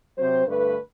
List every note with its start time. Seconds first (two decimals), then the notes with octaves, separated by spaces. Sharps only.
0.17 C3 F#3 C4 C5
0.46 G2 D3 A3 B4